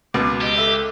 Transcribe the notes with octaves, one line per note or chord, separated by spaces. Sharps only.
C#2 B2 D6
G4 D#5
A4 E5